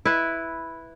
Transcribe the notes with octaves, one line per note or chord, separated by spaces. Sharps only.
E4 B4